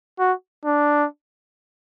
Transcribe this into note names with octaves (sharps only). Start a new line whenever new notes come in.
F#4
D4